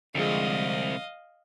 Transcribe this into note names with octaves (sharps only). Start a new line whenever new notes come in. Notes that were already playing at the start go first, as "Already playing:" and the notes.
C2 D3 F3 G#3 D#5 F5